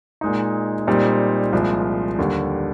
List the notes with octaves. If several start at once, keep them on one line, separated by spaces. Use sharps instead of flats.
A#2 G#3 D#4
A#2 G3 C4 D#4
C2 A#2 F3 G#3
D#2 D3 G3